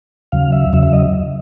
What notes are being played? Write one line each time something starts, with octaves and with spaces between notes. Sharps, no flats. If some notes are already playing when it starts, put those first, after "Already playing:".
D#2 C#3 F#3 F5
E5
E2 C#3 F#3 E5
E5
D#5